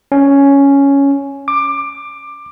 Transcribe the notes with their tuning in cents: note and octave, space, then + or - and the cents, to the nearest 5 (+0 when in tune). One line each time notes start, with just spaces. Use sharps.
C#4 +5
D6 +15